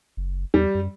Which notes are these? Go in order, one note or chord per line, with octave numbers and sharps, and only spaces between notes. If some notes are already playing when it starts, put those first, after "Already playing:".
F#1
E2 G3
F#2